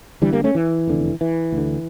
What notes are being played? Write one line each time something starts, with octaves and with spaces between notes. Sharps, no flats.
G1 G2 D3 E3 G3
G3 A#3
A3 C#4
E3
F1 E2 D3
E3
D2
D3